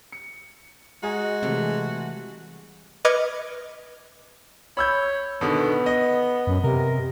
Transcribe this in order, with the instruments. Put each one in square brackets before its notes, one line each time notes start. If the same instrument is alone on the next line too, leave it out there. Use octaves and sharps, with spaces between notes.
[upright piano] C#7
[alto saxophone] G#3 [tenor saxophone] F#4 [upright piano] D#5 G#5 A#5
[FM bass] C3 [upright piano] E3 G3 A3
[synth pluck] B4 D#5 D6 F6 G#6 C#7
[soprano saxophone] C#5 [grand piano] B5 E6 G6
[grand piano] B2 D3 D#3 [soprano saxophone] B3
[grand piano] D#5
[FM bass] F#2
[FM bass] C3 [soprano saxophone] A#4